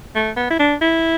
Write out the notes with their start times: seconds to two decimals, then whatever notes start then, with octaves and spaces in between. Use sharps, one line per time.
0.15 A3
0.36 B3
0.50 E4
0.59 D4
0.81 E4